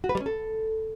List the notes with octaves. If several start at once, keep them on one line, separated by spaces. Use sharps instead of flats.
F#4
B4
G3
C#4
A4